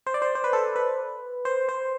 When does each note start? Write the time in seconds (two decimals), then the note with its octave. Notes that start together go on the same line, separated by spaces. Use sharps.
0.07 C5
0.14 D5
0.22 C5
0.35 C5
0.44 B4
0.53 A4
0.76 B4
1.45 C5
1.69 C5